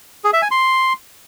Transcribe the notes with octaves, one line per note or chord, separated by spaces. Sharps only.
G#4
E5
G#5
C6